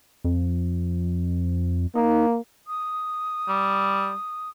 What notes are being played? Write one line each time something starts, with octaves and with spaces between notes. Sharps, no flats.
F2
A#3 D#4
D#6
G3